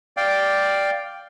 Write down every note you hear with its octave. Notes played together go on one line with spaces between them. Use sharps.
D5 F5 G5